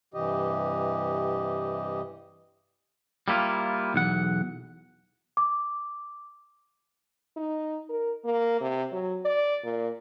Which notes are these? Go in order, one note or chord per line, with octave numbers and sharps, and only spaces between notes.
G2 C3 E3 G4 D#5
G3 A#3 E4 F4
B1 E2 F#5
D6
D#4
A#4
A#3
C3
F#3
D5
A#2